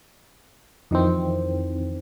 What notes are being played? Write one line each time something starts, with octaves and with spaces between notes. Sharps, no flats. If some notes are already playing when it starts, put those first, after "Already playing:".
F2 D#3 E3 C4